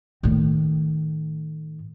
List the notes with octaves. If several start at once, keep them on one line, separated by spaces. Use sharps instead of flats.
A2 D#3